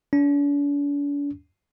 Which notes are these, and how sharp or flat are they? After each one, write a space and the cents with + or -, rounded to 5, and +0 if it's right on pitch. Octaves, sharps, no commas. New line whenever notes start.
D4 -45